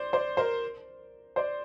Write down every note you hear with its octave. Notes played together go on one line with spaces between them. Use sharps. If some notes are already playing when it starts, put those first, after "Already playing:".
Already playing: C5 D5
C5 D5
A#4 C5
C5 D5